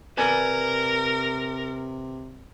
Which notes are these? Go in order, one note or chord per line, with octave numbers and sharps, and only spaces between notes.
C3 A#4 B4 D5 G#5